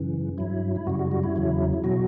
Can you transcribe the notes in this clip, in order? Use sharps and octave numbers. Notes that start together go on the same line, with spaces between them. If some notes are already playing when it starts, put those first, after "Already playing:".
Already playing: F#2 C#3 E3
G2 F#3 E4
E4
F#2 C#3 G3 F#4
F#4
F#4
E4
E2 C#3 F#3
B2 F#3 F#4